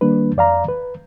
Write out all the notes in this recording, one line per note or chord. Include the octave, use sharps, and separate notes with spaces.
D#3 G3 A#3 D4 B4
F2 D5 F5 A#5
B4